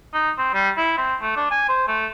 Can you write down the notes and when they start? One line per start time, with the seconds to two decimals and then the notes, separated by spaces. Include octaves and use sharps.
0.14 D#4
0.38 C4
0.54 G3
0.77 E4
0.97 C4
1.22 A3
1.36 D4
1.51 G#5
1.68 C5
1.88 A3